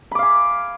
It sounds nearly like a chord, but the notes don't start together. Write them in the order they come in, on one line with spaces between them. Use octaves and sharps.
B5 D6 F5 G#5